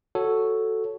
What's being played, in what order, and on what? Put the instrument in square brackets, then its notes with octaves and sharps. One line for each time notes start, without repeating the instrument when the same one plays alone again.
[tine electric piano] F#4 A4 C#5